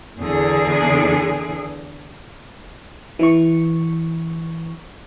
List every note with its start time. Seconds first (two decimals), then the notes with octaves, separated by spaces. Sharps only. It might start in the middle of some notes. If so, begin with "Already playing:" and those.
0.19 E2 D3 G#4
3.19 E3 C#6